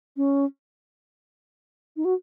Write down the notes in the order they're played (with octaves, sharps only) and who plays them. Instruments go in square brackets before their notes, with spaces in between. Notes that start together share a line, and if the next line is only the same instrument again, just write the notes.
[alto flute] C#4
D#4
F#4